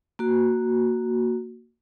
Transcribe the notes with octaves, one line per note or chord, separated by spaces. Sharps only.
A#3 F#4